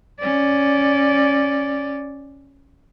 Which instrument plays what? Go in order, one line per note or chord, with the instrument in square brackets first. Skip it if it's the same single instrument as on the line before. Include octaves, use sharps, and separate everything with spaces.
[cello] C#4 D5